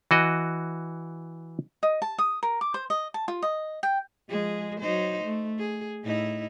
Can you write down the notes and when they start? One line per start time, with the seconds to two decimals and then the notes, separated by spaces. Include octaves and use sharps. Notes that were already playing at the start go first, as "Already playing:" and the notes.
0.11 E3 F#4 D#5
1.83 D#5
2.02 A5
2.19 D#6
2.43 A#4
2.61 D6
2.74 C5
2.90 D#5
3.14 A5
3.28 F4
3.42 D#5
3.83 G5
4.28 F3 G#3 G#4
4.80 F#3 D#4 C5
5.24 A3
5.58 G#4
6.03 A2 D#4 E4